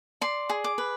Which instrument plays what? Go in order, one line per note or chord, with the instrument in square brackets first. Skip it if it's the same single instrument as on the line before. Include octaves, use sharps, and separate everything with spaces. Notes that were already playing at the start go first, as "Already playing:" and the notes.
[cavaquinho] D5 C6
G#4
D6
B4